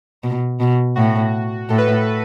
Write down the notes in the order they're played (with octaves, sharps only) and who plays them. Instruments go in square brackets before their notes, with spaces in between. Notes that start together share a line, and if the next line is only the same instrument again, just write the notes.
[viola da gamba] B2
B2
[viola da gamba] A2 [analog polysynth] F#4
[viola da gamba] A2 [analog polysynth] A4
[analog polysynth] B4
A4